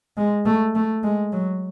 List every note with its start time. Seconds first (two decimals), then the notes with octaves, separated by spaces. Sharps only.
0.17 G#3
0.46 A3
0.75 A3
1.04 G#3
1.32 F#3